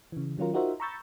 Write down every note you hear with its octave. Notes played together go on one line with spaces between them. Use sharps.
C#3 E3
D#3 F#3 C#4 F4 A#4
D#4 F4 F#4 A#4 C5 E5
A#5 B5 C#6 E6 G6 A6